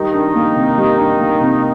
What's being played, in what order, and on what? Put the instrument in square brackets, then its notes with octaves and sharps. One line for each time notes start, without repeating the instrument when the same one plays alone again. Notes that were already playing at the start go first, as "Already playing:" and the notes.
Already playing: [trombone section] D#3 D#4 [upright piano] G3
[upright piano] D4
A#3
C3
G3
D4
A#3
C3